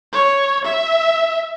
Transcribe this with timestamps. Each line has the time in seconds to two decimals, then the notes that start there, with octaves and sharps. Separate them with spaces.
0.13 C#5
0.65 E5